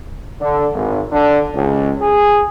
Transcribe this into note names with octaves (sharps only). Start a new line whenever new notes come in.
D3
G#1
D3
C#2
G#4